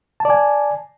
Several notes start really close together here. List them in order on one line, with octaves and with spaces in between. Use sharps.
A5 D5 G#5